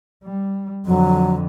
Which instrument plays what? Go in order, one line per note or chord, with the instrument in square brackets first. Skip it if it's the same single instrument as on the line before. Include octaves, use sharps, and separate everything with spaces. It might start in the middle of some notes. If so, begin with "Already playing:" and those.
[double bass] G3
[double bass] F2 D3 [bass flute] F#3